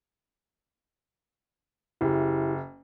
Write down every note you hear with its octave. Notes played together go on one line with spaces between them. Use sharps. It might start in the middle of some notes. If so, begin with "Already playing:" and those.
F#1 E4 G4